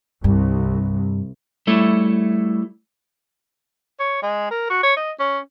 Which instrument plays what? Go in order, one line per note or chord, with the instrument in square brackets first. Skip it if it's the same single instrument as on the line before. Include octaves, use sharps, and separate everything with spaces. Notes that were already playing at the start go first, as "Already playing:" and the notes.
[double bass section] C2 [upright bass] G2
[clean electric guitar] G3 A3 E4 A4 C#5
[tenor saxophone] C#5
G#3
A#4
F#4
C#5
D#5
C#4